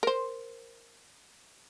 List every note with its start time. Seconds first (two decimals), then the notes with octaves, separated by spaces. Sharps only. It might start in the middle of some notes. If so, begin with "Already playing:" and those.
0.03 A#4 C5